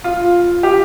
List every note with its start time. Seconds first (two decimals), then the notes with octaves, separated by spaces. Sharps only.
0.04 F4
0.63 G4